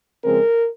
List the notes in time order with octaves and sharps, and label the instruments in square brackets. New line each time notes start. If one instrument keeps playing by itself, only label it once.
[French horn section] C#3 F3 G#3 C4 A#4